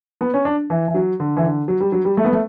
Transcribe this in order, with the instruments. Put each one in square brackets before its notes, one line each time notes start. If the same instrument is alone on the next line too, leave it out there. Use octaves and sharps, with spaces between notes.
[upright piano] B3
C#4
D4
E3
E3
F#3
D3
E3
D3
F#3
G3
F#3
G3
A3
B3
A3